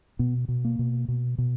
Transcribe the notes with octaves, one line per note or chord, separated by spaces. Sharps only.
B2 B3
B2
A#3
B2
B2
B2